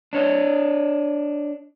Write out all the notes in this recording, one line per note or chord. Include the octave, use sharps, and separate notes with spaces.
D4 C#5 D#5